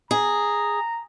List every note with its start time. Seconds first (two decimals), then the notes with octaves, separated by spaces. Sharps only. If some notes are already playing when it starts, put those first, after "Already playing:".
0.11 G#4 A#5